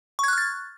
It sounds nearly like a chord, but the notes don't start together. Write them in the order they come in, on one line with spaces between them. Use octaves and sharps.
C#6 G#6 F#6 F6 A6